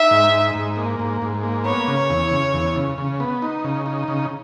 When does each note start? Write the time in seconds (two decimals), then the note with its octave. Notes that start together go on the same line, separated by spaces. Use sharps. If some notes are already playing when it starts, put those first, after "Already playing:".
Already playing: D#4 E5
0.11 G#2
0.33 D#4
0.55 G#2
0.77 A#3
0.99 G#2
1.22 G#2
1.43 A#3
1.65 B3 C#5
1.88 C#3
2.10 E2
2.31 C#3
2.54 E2
2.76 C#3
2.98 C#3
3.20 B3
3.42 D#4
3.64 C#3
3.86 D#4
4.08 C#3